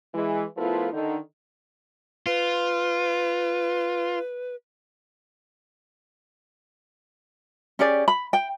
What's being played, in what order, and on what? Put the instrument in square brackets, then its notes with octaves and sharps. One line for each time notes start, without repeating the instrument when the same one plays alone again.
[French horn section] E3 G#3
F3 A3 B3 E4 F4 A#4
D3 D#3 D#4
[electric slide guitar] F4 [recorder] B4
[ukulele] C#4 G4 G#4 D5
B5
G5